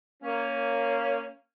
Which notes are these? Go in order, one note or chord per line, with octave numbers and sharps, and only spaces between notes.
A#3 C#4